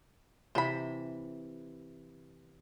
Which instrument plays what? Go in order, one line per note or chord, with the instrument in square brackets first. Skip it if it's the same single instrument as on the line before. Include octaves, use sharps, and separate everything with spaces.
[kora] C3 E3 [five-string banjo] C5 B5